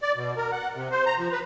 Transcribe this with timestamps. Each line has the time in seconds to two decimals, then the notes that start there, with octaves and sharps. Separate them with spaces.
0.02 D5
0.16 B2
0.37 A#4
0.52 F#5
0.75 C3
0.91 C5
1.06 A#5
1.19 F3
1.32 B4